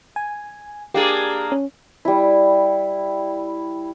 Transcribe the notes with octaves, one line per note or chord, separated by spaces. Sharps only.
G#5
A#3 D4 G4 G#4
C#4
G3 E4